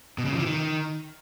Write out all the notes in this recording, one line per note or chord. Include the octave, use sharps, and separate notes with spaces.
B2
C#3
F3
E3
D#3